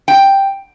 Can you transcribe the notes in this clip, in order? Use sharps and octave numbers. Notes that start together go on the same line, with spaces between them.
G5